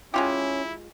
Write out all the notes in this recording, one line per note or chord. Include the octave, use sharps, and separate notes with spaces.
G#3 C#4 E4 F4 G4